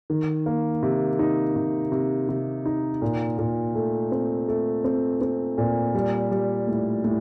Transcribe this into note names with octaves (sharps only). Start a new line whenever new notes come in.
D#3
A#3
C3
D#4
C3
C3
C3
D#4
A#2
A#2
A3
C4
A3
C4
C4
A#2
G3
G3
A2
A2